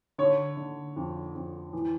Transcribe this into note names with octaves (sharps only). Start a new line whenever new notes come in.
D3 C#5
D3
F2
F2
E3